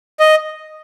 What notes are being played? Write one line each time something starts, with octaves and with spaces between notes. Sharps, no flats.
D#5